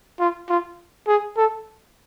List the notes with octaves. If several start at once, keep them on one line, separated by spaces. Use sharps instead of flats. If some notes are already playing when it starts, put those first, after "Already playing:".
F4
F4
G#4
A4